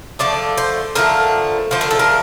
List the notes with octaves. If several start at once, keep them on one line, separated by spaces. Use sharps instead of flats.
D3 F3 A3 D5
C5
D3 F3 A3 A#4
D3 F3 A3 C5
A#4
A4
A#4